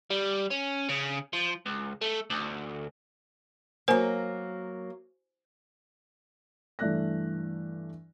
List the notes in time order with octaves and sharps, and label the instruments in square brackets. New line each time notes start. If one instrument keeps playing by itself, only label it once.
[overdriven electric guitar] G3
C#4
C#3
F3
C#2
A3
D2
[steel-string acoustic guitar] F#3 A#3 [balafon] C5 G#5
[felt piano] G2 E3 A3 D5 F#6 A#6